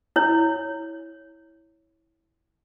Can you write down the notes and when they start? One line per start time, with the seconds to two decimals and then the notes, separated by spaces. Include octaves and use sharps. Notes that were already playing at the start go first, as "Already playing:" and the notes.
0.16 E4 C#5